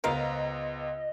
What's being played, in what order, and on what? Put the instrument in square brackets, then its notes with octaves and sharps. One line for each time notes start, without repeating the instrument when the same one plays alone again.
[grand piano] C#2 B3 [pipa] A#4 C5 F5 [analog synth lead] D#5